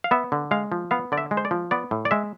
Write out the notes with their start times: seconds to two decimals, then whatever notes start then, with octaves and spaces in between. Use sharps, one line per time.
0.04 F5
0.11 B3 E5
0.32 D3
0.51 G#3 F5
0.72 F3
0.91 B3 F5
1.12 D3 D5
1.18 E5
1.31 G#3
1.37 C5
1.45 D5
1.51 F3
1.71 B3 D5
1.91 A2
2.05 D5
2.11 G#3 E5